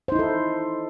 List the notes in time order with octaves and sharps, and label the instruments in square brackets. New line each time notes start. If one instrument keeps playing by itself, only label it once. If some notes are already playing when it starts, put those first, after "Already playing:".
[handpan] C5
D#4
E4
A4